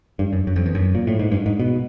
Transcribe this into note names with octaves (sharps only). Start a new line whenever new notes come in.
G2
F#2
F#2
F2
E2
F#2
A#2
A2
G#2
G2
G#2
B2